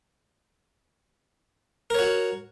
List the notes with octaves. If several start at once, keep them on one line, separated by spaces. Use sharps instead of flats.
F#4 A#4 C#5